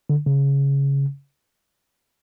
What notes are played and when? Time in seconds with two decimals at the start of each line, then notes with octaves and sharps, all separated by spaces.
0.10 D3
0.26 C#3